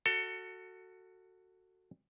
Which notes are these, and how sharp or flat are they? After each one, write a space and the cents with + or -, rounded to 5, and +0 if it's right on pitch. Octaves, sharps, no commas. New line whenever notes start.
F#4 +0 A4 +25